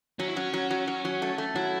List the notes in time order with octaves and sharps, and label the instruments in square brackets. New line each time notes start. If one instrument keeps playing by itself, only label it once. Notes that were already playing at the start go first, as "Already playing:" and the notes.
[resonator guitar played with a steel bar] F#3 [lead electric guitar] C#4
[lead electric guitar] E4
[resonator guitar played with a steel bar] F#3 [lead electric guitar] C#4
[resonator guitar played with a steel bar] F#3
F#3
F#3
F#3
A3
A3
[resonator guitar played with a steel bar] F#3 [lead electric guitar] E4